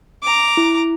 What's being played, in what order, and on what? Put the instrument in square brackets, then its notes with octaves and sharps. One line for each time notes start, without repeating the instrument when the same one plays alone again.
[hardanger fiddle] A#5 D6
[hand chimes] E4